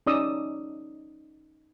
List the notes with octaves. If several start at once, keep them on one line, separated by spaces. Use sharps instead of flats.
C#4 D#4 D5 D#6 E6